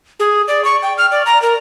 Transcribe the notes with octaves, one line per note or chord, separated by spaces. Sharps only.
G#4
D5
C#6
G5
F6
D5
A#5
A#4